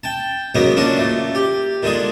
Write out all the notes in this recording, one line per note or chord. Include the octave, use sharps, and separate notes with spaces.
G5 A5
C#3 F#3 G#3 A#3 B3
A#2 C#3 C#4 D4 F#4
A#2 A3
G4
A#2 D3 G#3 G#4